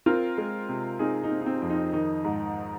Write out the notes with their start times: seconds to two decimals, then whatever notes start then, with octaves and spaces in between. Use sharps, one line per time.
0.06 C4 F4 A#4
0.38 G#3
0.69 C3
0.99 C4 D#4 G#4
1.24 D#4
1.31 C4
1.41 D#4
1.46 C4
1.62 F2
1.70 D#4
1.93 D#3 D#4
2.25 G#2